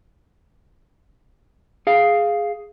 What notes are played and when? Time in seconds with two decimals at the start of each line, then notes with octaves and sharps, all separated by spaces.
1.87 G#4 F5